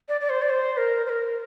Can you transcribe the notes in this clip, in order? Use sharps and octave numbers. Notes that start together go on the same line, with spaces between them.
D5
D5
C5
D5
C5
A#4
C5
A#4